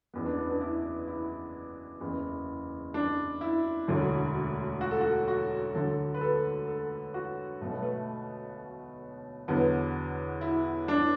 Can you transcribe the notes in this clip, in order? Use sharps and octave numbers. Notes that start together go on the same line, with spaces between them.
F#1 E2 E3 B3
D4
B3
D4
E4
E4
F#1 E2 E3
D4
E4
E1 D2 D3 F#3
F#4
A4
F#4
F#4
D2 D3 F#3 A4
B4
A4
A4
F#4
B1 B2 F#3 A3
B3
A3
E2 D3 F#3 B3
E4
D4